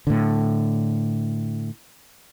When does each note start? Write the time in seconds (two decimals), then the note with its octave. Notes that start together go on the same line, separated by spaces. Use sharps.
0.07 A2 D3